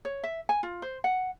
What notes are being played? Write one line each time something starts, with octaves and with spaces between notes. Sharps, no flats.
C#5
E5
G#5
F4
C5
F#5